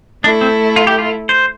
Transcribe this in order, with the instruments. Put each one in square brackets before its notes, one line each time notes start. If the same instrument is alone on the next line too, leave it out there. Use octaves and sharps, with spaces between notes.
[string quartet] A3 E4 A4 [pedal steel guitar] D4
[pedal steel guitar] C4
F4
G4
F4
C5